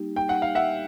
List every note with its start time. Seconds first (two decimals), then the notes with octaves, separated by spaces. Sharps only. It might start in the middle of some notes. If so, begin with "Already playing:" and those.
Already playing: G3 A#3 D#4 G4
0.16 G5
0.29 F#5
0.42 F5
0.55 E5 F#5